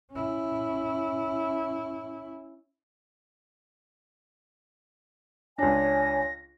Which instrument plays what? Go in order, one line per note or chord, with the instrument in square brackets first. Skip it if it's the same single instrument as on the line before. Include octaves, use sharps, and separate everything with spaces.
[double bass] C#4 E4
[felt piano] C#2 D4 [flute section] C#5 G#5 [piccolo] A#6